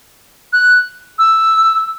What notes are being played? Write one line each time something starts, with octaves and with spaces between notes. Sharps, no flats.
F#6
E6